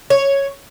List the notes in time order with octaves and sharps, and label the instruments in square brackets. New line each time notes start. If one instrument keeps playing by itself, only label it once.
[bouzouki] C#5